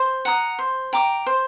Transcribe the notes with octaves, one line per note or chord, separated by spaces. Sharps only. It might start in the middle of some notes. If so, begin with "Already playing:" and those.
Already playing: C5
F#5 A#5 D#6
C5
G5 A#5 D6
C5